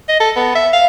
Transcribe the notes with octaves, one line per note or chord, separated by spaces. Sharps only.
D#5
A4
B3
E5
F5